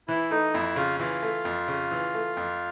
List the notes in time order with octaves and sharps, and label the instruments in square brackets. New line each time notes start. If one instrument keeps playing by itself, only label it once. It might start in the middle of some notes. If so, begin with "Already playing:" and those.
[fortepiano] E3 [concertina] E4
[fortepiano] A3 [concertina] D#4
[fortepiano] F2 [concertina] E4
[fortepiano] C#3 [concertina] F4
[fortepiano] E3 [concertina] F4
[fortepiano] A3
F2
C#3
E3
A3
F2